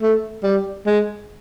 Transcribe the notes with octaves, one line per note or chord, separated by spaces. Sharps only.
A3
G3
G#3